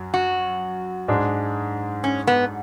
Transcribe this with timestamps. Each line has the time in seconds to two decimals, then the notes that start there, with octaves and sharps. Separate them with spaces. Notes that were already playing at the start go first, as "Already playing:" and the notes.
Already playing: F#2 F#3
0.14 F#4
1.08 G#2 G#3 D4
2.04 C#4
2.27 B3